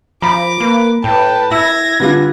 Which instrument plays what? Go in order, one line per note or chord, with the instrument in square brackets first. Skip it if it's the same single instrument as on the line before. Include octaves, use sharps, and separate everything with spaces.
[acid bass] F3 [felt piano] A#5 B5 [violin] D6
[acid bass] A#3 [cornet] B4
[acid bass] A2 [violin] B4 A5 [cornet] G5
[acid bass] E4 [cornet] E5 [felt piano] E6 [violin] G#6 A#6
[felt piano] D3 G3 F4 [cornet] B4